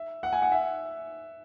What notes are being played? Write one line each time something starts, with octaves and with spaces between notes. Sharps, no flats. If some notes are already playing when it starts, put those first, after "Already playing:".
Already playing: E5
F#5
G#5
F#5
E5